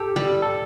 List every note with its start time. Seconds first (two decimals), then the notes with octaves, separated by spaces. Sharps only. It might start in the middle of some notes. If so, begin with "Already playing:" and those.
Already playing: G4 A4
0.16 G3
0.42 A4